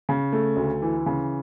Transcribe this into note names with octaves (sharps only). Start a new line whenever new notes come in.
C#3
A3
D2
E3
C#3